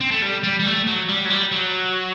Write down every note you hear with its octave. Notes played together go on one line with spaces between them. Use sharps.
C4
A3
G3
G3
G3
A3
F#3
G3
F#3
G3
F#3